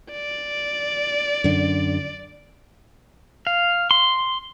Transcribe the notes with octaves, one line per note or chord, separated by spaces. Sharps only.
D5
F#2 D3
F5
C6